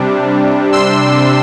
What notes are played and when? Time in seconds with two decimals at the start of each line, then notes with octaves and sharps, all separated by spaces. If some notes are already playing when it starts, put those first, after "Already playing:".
Already playing: C3 G3 D4
0.72 C6 E6